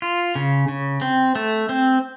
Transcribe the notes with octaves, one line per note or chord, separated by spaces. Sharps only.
F4
C#3
C#3
C4
A3
C4